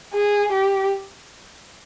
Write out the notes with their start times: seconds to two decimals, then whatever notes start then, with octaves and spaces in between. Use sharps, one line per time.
0.14 G#4
0.52 G4